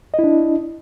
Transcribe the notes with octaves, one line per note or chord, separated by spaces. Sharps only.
D4 E4 D#5